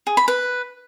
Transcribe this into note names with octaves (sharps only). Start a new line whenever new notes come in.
G#4
B5
B4